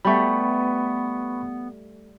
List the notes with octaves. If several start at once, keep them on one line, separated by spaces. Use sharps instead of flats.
G3 A3 B3 B5 C#6